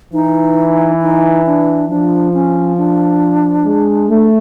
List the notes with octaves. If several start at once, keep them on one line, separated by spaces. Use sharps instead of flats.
E3 D#4
D#4
D4
F3 D4
C#4
D4
G#3
A3